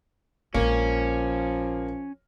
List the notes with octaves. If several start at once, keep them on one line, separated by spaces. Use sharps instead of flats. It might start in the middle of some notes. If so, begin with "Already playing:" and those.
A#1 F3 G#3 A#3 C#4